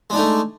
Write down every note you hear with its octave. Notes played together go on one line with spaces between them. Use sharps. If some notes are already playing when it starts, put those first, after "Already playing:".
G#3 A3 D4 D#4